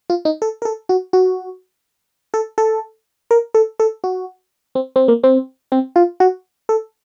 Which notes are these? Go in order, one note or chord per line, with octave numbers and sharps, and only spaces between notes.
F4
D#4
A4
A#4
A4
F#4
F#4
A4
A4
A#4
A4
A4
F#4
C4
C4
A#3
C4
C4
F4
F#4
A4